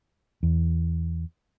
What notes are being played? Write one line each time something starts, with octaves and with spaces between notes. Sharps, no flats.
E2